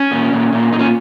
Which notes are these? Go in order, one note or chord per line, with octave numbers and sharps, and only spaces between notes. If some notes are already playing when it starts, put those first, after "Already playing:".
Already playing: C#4
A#2
A#2
A#2
A#2 D#4
C#4